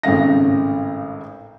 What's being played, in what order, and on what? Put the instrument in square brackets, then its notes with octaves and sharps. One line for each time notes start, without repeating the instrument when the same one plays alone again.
[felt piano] G#1 A2 C#3 F5 A#6